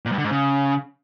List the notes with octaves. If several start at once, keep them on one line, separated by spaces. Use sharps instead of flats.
A#2
G2
D3
G#2
C#3